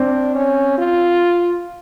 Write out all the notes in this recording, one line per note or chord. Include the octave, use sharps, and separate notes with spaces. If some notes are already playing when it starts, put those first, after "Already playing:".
Already playing: C4 D4
C#4
F4